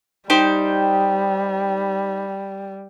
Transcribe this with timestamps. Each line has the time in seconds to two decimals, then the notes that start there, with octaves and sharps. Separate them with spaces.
0.30 G3 D#4 G4 C5